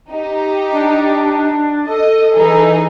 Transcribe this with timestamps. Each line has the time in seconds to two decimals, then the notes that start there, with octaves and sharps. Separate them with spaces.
0.11 D#4 G4
0.72 D4
1.87 A4 D#5
2.36 E3 D#4 G#4